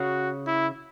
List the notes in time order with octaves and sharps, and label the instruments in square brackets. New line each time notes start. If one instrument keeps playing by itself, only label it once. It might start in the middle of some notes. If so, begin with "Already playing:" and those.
Already playing: [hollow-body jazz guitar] C#3 [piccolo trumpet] F#4
[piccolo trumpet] E4